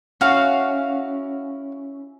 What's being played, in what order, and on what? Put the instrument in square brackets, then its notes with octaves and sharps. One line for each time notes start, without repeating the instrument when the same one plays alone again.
[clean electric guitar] C#4 E4 [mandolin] F#4 F5